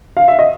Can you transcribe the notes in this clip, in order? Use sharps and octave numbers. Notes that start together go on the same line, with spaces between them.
F5
E5
D#5